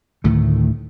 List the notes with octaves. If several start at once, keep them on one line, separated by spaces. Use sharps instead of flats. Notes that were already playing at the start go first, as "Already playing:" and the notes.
D2 A2 D#3 A3